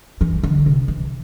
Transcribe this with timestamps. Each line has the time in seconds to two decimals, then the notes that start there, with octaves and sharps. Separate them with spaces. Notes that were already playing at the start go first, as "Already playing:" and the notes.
0.21 E3
0.43 D3
0.66 C3
0.88 E3